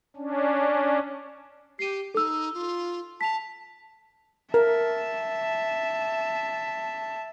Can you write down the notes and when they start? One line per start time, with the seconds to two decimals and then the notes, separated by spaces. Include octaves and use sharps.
0.16 C#4 D4
1.79 G4 C7 D#7
2.14 D#4 A4 E6
2.54 F4
3.21 A5 B6 F7
4.54 A#4 E5 A5